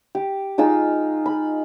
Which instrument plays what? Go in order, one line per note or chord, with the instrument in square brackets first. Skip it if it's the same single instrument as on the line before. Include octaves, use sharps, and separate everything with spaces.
[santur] G4
G#3 D#4 F4 E6
B5